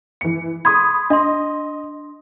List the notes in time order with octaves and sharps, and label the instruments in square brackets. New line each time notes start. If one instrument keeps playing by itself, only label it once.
[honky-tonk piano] E3 C#7
[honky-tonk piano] B5 C6 D#6 [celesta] G#6
[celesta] D4 C6 [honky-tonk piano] D#5